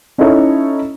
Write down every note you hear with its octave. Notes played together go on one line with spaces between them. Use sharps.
C#4 D#4 E4 A4 C#5 E5